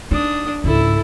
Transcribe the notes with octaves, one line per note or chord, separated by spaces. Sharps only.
D4 D#4 D#6
C#2 G#2 E4 A4